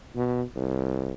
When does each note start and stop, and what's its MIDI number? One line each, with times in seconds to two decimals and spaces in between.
0.16 0.42 47
0.56 1.14 36